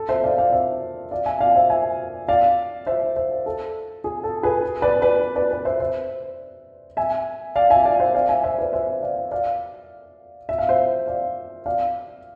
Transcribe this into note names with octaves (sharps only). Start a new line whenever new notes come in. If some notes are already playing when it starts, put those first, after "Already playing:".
Already playing: A4
C5 E5
D5 F5
D5 F5
C5 E5
D5 F5
E5 G#5
D5 F5
C5 E5
E5 G#5
D5 F5
C5 E5
C5 E5
A4
G#4
A4
G#4 B4
B4 D5
B4 D5
B4 D5
B4 D5
C5 E5
C5 E5
E5 G#5
D5 F5
E5 G#5
D5 F5
C5 E5
D5 F5
E5 G#5
C5 E5
B4 D5
C5 E5
D5 F5
D5 F5
E5
F5
C5 E5
D5 F5
D5 F5